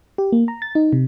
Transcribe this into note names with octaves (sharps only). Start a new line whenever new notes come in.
G4
A#3
A#5
A6
D#4
C3